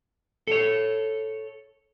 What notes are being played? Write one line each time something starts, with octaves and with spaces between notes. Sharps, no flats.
A4 C#5